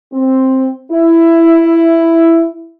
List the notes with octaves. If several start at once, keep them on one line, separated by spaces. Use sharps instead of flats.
C4
E4